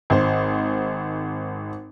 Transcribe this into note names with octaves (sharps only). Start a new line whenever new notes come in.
G#1 C5